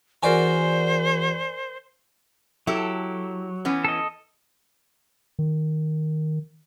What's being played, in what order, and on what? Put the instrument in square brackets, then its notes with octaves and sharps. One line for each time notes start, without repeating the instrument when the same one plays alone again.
[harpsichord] E2 F#4 D6 [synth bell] A#4 D5 G#5 [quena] C5
[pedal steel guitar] F#3 [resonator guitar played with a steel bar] E4 G4 A4
[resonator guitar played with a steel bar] E3 B3 C#4
[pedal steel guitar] A4 D#5
[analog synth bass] D#3